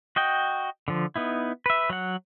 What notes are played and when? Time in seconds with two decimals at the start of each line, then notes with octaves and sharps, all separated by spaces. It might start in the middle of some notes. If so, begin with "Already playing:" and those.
0.16 F#4 D#5 G5
0.88 D3 F3
1.16 B3 D#4 E4
1.66 B4 E5
1.90 F#3 F#5